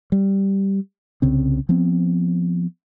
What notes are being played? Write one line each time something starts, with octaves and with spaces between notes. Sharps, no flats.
G3
C2 C#3 C4
F3 B3 C4